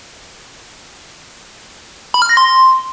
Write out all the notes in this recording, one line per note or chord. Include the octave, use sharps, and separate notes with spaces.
B5
F6
A#6
C6